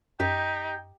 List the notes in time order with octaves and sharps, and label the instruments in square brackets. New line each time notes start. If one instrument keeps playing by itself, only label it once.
[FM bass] F#2 [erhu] D#4 [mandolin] G4 [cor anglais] G5